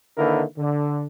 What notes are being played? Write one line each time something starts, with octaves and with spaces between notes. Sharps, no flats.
D3 D#3 A#3 E4 A#4 B4
D3